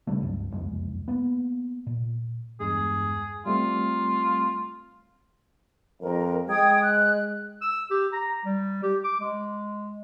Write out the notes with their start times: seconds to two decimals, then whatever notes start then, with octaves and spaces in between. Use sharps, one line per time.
0.07 A#1 C#3 G3 A3
0.22 C#2 G2 F#3
0.52 F#1 C2 F2 G#3
1.08 A#3 B3
1.87 A#2
2.60 E2 G2 G#3 G#4
3.46 G3 A3 C4 F4
6.02 F2 A#4
6.50 G#3 G5 D#6 G#6
6.84 F#6
7.61 E6
7.90 G4
8.13 A#5
8.45 G3
8.83 G4
9.04 D6
9.20 G#3